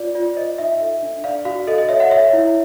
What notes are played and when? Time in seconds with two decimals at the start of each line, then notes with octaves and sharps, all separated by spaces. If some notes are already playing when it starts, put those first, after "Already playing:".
Already playing: F4 D5
0.15 F4 D5
0.37 C5 D#5
0.58 D#4 E5
0.80 A4 E5
1.03 D4
1.24 D5 F5
1.45 F#4 F5
1.67 A4 D#5
1.78 D#5
1.89 C#5 E5
2.00 F#5
2.10 C#5 E5
2.33 E4